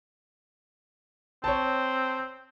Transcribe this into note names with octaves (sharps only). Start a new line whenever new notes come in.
C4 C#5 A5